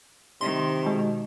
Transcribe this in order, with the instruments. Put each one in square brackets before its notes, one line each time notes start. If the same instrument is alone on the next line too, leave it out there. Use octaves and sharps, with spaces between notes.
[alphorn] C3 [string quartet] D#3 [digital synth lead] C6
[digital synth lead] B2 [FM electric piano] G#3